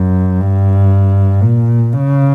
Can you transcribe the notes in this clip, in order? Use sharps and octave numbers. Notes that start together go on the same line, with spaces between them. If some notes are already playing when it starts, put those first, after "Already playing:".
Already playing: F#2
G2
A#2
C#3